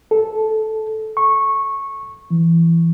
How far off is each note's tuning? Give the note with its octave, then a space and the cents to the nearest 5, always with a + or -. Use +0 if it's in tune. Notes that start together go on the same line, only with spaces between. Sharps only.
A4 -10
C#6 -15
E3 +15